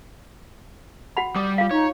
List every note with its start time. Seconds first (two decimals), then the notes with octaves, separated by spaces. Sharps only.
1.17 F#4 F#5 B5
1.36 G3 D6 D#6
1.58 F4 F5
1.71 D#4 C#5